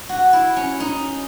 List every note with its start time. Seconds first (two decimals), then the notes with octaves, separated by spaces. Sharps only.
0.09 F#4
0.33 E4
0.57 C#4
0.80 D#4